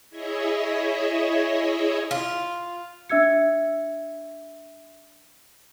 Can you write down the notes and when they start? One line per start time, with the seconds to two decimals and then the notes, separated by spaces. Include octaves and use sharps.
0.10 E4 G#4 C#5 D#5 E5
2.11 F4
3.09 D4 E5 E6 G#6 C#7